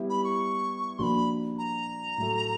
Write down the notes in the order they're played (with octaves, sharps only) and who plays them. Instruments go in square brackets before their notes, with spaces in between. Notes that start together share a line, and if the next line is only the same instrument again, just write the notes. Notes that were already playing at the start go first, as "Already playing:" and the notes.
Already playing: [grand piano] G3 B3 E4 G4
[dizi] B5
C#6
[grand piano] A#2 F3 A#3 D4 F#4 [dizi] B5 C6
[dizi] A#5
[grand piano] A2 F#3 A3